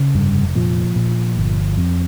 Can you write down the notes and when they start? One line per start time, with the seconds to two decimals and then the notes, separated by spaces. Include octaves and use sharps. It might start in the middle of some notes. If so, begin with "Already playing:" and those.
Already playing: C#3
0.15 F1 G2 G3
0.55 A#2 F3
0.96 A#2
1.37 G1
1.78 F2